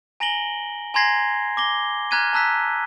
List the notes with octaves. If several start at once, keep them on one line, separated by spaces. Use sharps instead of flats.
G#5 A#5 A#6 D7 F#7 G7
G#5 A#5 C6 G#6 A#6 C7
D6 A#6 G7
A#5 F6 F#6 G#6 B6 D#7
A5 A#5 E6 F#6 B6